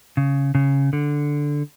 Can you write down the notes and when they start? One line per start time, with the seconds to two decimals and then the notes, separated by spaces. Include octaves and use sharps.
0.17 C#3
0.55 C#3
0.93 D3